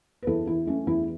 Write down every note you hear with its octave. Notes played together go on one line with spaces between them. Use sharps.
B4
E2 E4 A4
E3 E4
A3 C#4
E2 E4